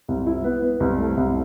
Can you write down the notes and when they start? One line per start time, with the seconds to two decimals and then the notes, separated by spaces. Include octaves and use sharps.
0.08 C2
0.27 E4
0.44 B3
0.62 B3
0.80 C2
0.99 A3
1.17 C2